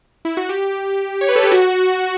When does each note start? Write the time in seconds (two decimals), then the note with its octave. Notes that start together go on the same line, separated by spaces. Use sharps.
0.25 E4
0.37 F#4
0.49 G4
1.21 C#5
1.29 B4
1.36 A4
1.43 G4
1.52 F#4